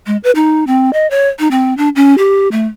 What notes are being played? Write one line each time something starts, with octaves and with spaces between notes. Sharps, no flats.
G#3
B4
D#4
C4
D#5
C#5
D#4
C4
D4
C#4
G4
A3